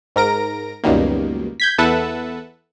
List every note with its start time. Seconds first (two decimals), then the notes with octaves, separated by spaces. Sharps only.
0.16 G#2 A#4 A#6 D7
0.84 C#2 F#2 B2 D#3 G3 A#3
1.60 G6 G#6 B6
1.78 E2 A4 B4 E5 F#5 A5